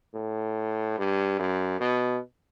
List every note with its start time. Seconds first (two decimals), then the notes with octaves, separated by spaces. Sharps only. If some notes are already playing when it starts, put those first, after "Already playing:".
0.14 A2
0.98 G2
1.39 F#2
1.80 B2